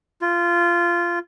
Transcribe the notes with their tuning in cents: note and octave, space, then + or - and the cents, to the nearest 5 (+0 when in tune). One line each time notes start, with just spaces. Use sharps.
F4 -15